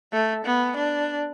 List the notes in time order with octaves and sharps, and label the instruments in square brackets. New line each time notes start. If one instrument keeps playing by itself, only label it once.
[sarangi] A3
B3
D4